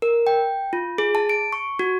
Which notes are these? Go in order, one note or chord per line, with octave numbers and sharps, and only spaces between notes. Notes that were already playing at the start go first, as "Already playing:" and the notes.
A#4
G5
F4
G#4
A5
D7
C#6
F#4